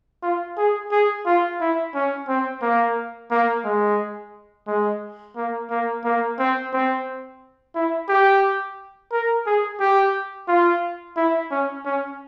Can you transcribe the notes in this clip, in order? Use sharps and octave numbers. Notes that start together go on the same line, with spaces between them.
F4
G#4
G#4
F4
E4
C#4
C4
A#3
A#3
G#3
G#3
A#3
A#3
A#3
C4
C4
E4
G4
A#4
G#4
G4
F4
E4
C#4
C#4